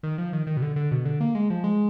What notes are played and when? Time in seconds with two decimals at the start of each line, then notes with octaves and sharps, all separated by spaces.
0.03 D#3
0.18 F3
0.33 D#3
0.47 D#3
0.57 B2
0.62 D3
0.76 D3
0.91 B2
1.05 D3
1.21 A#3
1.35 G#3
1.50 F3
1.64 G#3